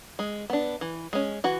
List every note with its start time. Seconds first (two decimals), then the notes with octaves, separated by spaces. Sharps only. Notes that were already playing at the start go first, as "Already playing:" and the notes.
0.19 G#3
0.50 B3 D4
0.81 E3
1.13 G#3 C#4
1.44 E3 F#4